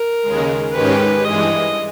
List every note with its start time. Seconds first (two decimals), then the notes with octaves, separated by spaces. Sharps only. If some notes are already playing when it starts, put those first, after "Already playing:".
Already playing: A#4
0.23 D#2 C#3 G#3
0.73 G#2 D#3 G#3 C#4 G4 B4
1.24 G2 E3 G#3 D#5